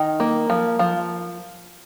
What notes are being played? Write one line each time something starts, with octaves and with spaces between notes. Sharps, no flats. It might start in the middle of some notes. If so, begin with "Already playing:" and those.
Already playing: D#3
A#3
F3
F3